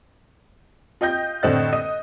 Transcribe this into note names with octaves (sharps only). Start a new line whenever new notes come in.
F4 D#5 G5 G6 A#6
A2 D3 C4 D#5 F#6 A6
D#5 D#6 D#7